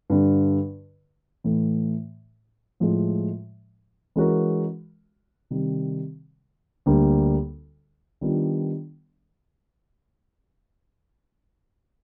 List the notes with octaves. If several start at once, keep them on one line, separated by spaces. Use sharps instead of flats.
G2 D3 G3
A2 E3 A3
A2 F3 G#3
E3 G#3 C#4 F#4 A#4
C3 D#3 G3
D2 D3 G3 A#3
D#3 G3 B3 D4 F4